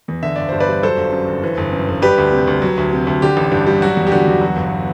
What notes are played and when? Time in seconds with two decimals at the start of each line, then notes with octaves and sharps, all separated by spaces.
0.08 E2
0.23 D3 E5
0.36 G1 D5
0.49 G2 C5
0.60 B4 D5
0.68 G3
0.83 F#3 A4 C5
0.97 G1
1.12 F#2
1.28 G1
1.43 E3
1.57 G1
1.72 F#2
1.88 G1
2.02 G3 G4 B4
2.18 D2
2.32 C3
2.47 D2
2.62 F#3
2.77 D2
2.93 C3
3.07 D2
3.22 D3 G4
3.37 A1
3.52 G2
3.67 G3
3.82 F#3 F#4
3.97 E2
4.07 G4
4.12 D3 F#4
4.27 E2
4.41 F#3
4.56 G1